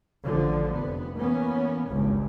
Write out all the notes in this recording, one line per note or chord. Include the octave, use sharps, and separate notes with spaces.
A1 D3 F3
F1 B3
E3 A#3 B3 C#4
G#1 C#2 G2